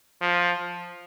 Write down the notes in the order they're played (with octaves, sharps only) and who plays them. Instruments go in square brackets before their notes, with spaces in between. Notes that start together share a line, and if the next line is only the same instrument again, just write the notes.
[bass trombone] F3